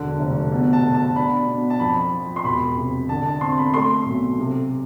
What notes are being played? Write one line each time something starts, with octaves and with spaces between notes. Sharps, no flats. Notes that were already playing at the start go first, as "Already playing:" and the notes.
Already playing: E1 D3
F1
B2
A5
B2
A5
D4 B5
B2
A5
F2 B5
F3
C6
E1 B5
C3
D3 A5
A5
C4 C6
B5
A3 C6
B1
C3